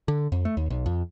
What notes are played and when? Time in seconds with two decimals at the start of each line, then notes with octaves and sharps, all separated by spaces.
0.08 D3
0.32 F2
0.45 A3
0.57 D#2
0.70 B1
0.86 F2